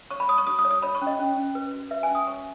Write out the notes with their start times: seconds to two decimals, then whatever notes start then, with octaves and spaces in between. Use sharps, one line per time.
0.11 C#5 C#6
0.20 B5
0.28 C#5 D#6
0.38 C#6
0.47 F#4 D#6
0.59 D#6
0.65 C#5
0.71 D#6
0.82 C#5 B5
0.95 C#6
1.02 C#4
1.07 D#5
1.19 C#4
1.37 C#4
1.55 B4
1.73 F#4
1.91 B4 E5
2.03 G#5
2.09 C#4
2.15 D#6
2.27 C#5 C#6